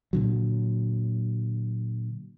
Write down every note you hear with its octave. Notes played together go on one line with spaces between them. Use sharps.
A#2 D3 F#3